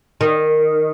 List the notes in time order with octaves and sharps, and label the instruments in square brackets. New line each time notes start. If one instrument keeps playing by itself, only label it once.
[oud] D#3